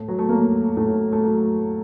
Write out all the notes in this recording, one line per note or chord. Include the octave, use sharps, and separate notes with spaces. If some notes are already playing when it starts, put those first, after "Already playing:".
Already playing: A2 A3
F#3
A3
A#3
A2 A3
A3
F#3